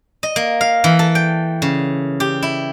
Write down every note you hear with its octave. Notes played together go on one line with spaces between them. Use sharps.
D#5
A#3
F5
E3
A4
G5
C#3
G4
E4